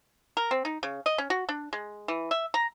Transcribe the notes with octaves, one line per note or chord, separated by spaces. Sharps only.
A#4
C4
D#4
C#3
D#5
C#4
F#4
D4
G#3
E3
E5
A#5